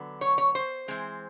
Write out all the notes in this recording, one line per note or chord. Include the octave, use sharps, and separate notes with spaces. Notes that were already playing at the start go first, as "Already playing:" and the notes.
Already playing: D3 F#3 B3
C#5
C#5
C5
E3 G#3 C4